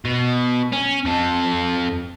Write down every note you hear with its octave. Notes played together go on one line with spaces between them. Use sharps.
B2
C#4
F2 A4